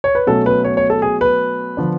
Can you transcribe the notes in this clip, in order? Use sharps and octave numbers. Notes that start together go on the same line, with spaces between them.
C#5
B4
B2 F#3 A3 C#4 A4
B4
C#5
C#5
A4
G#4
B4
D3 F3 B3 D4